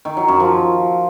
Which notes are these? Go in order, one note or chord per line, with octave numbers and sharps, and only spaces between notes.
D#3
F#3
F#2
F3